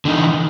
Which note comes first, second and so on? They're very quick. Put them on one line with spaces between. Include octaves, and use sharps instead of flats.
D3 D#4 E3